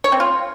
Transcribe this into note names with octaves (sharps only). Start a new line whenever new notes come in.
C#5
C4
F4